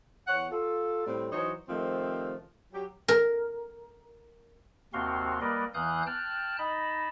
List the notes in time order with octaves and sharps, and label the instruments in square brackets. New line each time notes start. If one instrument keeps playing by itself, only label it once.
[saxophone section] E2 C#5 F#5
F4 A4
A2 G3 C4
E3 F#3 D#4 C5 C#5
C3 D#3 F3 A3 C4
F#3 G4
[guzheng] A#4
[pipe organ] D#2 C3 C4 F#4 F5 C6
G3 A#3 A#4 B4 D5 D#5
E2 E3 F5 D#6 F#6 G6
G5 A5 F6 F#6
D#4 D#5 A5 B5